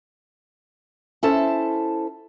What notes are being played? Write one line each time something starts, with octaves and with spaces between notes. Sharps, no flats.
C#4 E4 A4 C5 A5